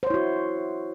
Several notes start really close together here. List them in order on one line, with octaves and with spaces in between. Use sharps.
C5 C#5 E4 F#4